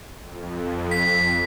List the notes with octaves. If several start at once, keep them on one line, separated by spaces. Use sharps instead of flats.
F2
B6